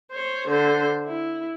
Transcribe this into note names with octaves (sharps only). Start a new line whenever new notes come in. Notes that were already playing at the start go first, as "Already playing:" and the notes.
C5 C#5
D3 C5
E4